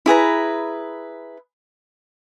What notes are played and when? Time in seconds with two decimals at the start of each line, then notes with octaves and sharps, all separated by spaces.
0.06 E4 G#4 B4 A#5